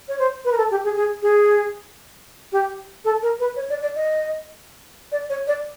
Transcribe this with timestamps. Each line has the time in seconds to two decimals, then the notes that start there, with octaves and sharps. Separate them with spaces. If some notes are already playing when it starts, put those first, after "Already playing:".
0.08 C#5
0.19 C5
0.45 B4
0.52 A#4
0.58 A4
0.71 G4
0.84 G#4
0.96 G#4
1.22 G#4
2.52 G4
3.05 A4
3.22 A#4
3.40 B4
3.56 C#5
3.70 D5
3.82 D5
3.95 D#5
5.12 D5
5.30 C#5
5.47 D5